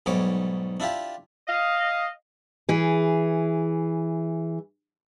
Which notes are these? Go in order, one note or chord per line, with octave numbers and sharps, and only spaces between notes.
B1 G#2 G3 C#5 D6
D4 E4 F4 G4
D#5 F5
E3 G#4